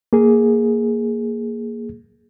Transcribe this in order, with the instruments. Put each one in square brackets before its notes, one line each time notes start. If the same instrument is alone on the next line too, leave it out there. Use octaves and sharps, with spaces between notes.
[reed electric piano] A#3 G#4